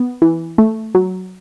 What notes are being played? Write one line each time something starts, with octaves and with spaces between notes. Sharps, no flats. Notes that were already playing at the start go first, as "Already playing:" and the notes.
Already playing: B3
E3
A3
F#3